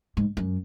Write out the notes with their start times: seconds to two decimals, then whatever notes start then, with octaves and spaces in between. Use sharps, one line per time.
0.17 G#2
0.37 F#2